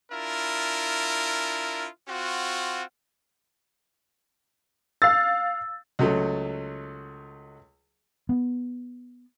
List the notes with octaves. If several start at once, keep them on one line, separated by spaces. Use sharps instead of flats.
D4 E4 F4 A#4
C4 F4 F#4
F5 E6 A6
C#2 F#3 A3
B3